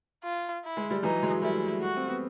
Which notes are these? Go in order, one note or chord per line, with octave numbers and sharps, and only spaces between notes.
F4
E4
G#3
G3
E3 F#3 D#4
F#3 G#3
G3 A3 E4
F#4
C4
B3